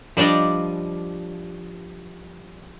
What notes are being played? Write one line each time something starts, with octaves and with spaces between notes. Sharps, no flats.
F3 G3 D4 D5 D#5